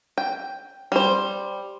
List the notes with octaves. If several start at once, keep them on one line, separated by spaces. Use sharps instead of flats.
G5
G3 C5